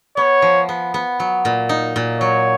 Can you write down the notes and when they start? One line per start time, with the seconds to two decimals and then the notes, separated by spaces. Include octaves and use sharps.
0.17 B3 C#5
0.42 F3
0.69 B3
0.94 B3
1.20 F#3
1.45 A#2
1.69 D#4
1.96 A#2
2.20 F#3 C#5